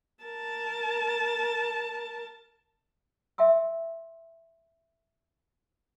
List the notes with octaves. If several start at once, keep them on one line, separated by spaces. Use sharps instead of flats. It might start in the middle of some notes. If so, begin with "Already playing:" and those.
A#4 A5
E5 G5 C6 E6